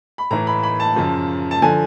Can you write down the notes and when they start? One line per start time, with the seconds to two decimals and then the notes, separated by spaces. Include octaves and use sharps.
0.18 B5
0.31 A2 E3 A#5
0.47 B5
0.63 B5
0.80 A5
0.96 F#2 C#3 F3
1.51 A5
1.62 D3 F3 G#5